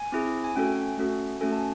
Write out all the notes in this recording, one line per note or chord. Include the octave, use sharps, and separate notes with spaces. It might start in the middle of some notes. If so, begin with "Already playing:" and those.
Already playing: G#5
C4 E4 G#4
G#5
A3 C#4 F#4 A4 G5
A3 C#4 F#4 A4
A3 C#4 F#4 A4 G#5
A5